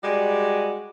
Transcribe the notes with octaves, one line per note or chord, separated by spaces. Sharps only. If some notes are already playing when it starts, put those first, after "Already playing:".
G3 G#3 F#4 D5